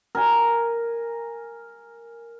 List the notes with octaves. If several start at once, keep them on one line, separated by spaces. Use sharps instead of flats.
A#4 G#5